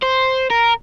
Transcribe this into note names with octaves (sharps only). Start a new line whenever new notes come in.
C5
A#4